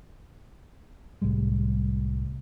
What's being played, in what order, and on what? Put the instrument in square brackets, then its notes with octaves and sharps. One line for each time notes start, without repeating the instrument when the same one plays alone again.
[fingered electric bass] C2 A2 G3 G#3